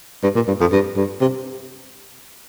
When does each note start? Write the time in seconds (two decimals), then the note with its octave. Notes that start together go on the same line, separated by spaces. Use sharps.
0.23 G2
0.35 A#2
0.48 G2
0.61 F2
0.72 G2
0.96 G2
1.21 C3